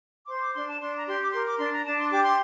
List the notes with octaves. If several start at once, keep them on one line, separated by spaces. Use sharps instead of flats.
D6
C5 C6
D6
D4 C6
A5
D4 C6
A#5
G4 C6
D6
A#4 C6
D6
D4 C6
A#5
D4 A5
C6
G4 D6
C6